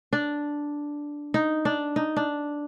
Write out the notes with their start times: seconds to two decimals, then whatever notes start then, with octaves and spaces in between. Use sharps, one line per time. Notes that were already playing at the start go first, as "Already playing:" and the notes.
0.13 D4
1.34 D#4
1.65 D4
1.96 D#4
2.16 D4